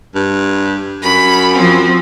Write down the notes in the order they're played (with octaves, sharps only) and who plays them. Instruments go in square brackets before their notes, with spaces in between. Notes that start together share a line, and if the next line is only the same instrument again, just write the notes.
[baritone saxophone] G2
[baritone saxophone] F#2 [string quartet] B5
[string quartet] F3 C4